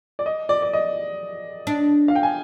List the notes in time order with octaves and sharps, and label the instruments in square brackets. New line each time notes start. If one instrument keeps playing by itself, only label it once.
[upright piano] D5
D#5
D5
D5
D#5
[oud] D4
[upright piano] F5
G5
G#5